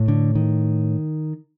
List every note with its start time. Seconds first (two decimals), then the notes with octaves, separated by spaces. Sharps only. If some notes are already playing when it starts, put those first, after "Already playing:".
Already playing: A2
0.08 D3
0.35 D#3